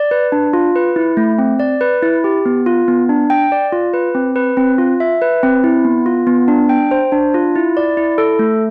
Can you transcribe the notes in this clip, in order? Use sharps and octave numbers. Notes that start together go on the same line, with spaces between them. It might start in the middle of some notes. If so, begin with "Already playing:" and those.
Already playing: D5
B4
D4
F4
B4
E4
A3
C4
D5
B4
E4
G4
B3
F4
B3
D4
G5
D5
F4
B4
C4
B4
C4
F4
E5
B4
C4
E4
B3
F4
B3
D4
G5
C5
D4
F4
E4
D5
E4
A4
A3